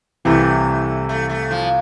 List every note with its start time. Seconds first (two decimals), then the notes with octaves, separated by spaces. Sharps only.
0.25 C2 C3 E3 A3
1.09 A3
1.30 A3
1.51 F3